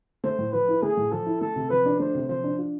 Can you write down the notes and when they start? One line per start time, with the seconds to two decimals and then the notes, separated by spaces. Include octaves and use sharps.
0.24 A3 C5
0.39 A2
0.53 F3 B4
0.68 E4
0.82 A3 G#4
0.97 A2
1.11 F3 A4
1.26 E4
1.41 A3 A4
1.56 C3
1.70 F3 B4
1.86 D4
2.00 A3 C5
2.15 C3
2.29 F3 C5
2.44 D4
2.59 F4